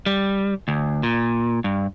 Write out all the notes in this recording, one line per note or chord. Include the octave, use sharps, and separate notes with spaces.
G3
D2
A#2
G2